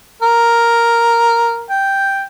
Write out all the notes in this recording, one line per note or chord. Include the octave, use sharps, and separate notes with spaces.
A#4
G5